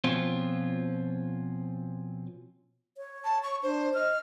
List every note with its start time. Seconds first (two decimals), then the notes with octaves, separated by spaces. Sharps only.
0.04 B2 F3 C4 C#4 F4
2.97 C#5
3.24 A5
3.43 C#6
3.63 D4 C5
3.94 D#5 F6